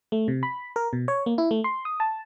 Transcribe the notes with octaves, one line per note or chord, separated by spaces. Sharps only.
A3
C3
B5
A#4
B2
C#5
A#3
E4
A3
C6
D#6
A5